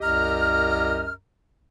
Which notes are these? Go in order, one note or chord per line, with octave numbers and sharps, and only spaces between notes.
C2 F#2 G4 D#5 A#5 F6